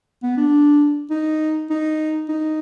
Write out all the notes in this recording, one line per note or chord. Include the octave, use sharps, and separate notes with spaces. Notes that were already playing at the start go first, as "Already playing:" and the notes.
B3
D4
D#4
D#4
D#4